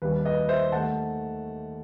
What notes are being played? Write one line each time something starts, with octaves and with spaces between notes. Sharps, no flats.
D#2 D#3 G3 B4
B4 D#5
C5 E5
D#2 D#3 A3 F#5 A5